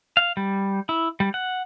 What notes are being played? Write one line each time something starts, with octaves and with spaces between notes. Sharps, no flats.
F5
G3
E4
G3
F#5